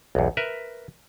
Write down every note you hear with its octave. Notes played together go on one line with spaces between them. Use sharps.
B1 E2
A#4 B4 E5